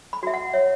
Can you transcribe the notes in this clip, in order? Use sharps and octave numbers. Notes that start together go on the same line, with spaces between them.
B5
F#4 E5
F#5
C#5 E5